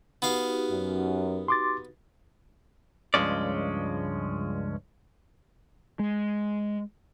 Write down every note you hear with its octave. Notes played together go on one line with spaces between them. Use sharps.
B3 D#4 F#4 G4 F5
F#2
C6 D6 A6
C#2 G2 F3 G#3 C#4 D5
G#3